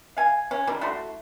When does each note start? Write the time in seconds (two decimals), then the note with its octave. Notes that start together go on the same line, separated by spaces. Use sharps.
0.17 F5 G#5
0.51 C#4
0.67 D#3 F3 G3
0.81 A3 E4 F#4 C6